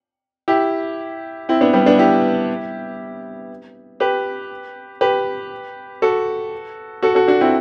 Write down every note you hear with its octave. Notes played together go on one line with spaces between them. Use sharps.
E4 G4
C4 E4
B3 D4
G3 B3
B3 D4
E4 G4
G4 B4
G4 B4
F#4 A4
F#4 A4
F#4 A4
D4 F#4
C4 E4